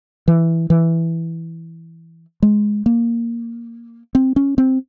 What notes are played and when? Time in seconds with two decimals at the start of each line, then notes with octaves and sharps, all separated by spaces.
0.28 E3
0.70 E3
2.43 G#3
2.86 A#3
4.15 C4
4.36 C#4
4.58 C4